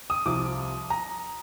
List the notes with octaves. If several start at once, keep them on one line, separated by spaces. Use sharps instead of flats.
D#6
C2 C3 F3 D6
A#5